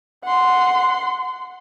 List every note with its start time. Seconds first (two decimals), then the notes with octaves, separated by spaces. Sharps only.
0.24 F#5 C6